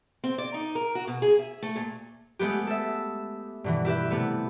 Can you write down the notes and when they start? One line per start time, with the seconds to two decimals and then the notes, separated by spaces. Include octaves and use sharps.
0.24 C4
0.38 D5
0.54 D#4
0.75 A#4
0.95 F#4
1.07 B2
1.22 G#4
1.39 E5
1.62 A3
1.76 A#2
2.39 G#3 A3 B3 G4
2.67 A4 E5
3.64 G2 B2 E3
3.85 E4 G4 B4 E5
4.10 C3 A3 B3